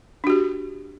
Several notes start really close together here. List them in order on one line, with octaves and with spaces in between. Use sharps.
D4 F#4 G4